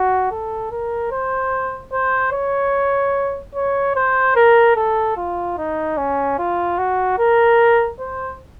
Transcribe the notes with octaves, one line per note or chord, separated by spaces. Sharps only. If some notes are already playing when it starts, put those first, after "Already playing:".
Already playing: F#4
A4
A#4
C5
C5
C#5
C#5
C5
A#4
A4
F4
D#4
C#4
F4
F#4
A#4
C5